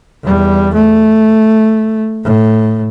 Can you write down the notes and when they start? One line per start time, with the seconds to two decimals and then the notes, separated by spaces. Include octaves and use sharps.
0.23 E2 G3
0.74 A3
2.24 A2